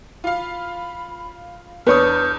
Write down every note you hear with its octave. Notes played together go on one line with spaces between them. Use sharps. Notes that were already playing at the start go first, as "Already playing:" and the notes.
F4 F5 B5
E2 D4 B4 C#5 A5 D#6 F6 G6